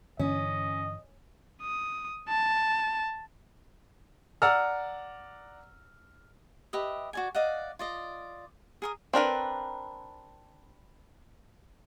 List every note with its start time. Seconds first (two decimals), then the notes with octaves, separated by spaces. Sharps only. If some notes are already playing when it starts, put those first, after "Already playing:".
0.19 G2 D3 E3 C#4 D#5
1.62 D#6
2.28 A5
4.42 D5 F#5 A#5 E6 F6
6.73 G4 B4 D#5 E5
7.13 F#4 D5 G#5
7.35 D5 D#5 F5 F#5
7.79 F4 D5 D#5
8.82 G#4 A#4 D#6
9.13 C4 D4 A#4 B4